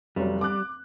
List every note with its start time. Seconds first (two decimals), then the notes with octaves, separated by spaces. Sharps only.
0.16 F1 F#3 G3
0.41 D6 F#6